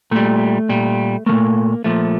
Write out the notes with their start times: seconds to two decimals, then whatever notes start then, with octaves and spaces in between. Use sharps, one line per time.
0.11 A#2 G3 A3
0.69 A#2 G3
1.26 F3 A3 A#3
1.32 A#2
1.84 A#2 F3 A3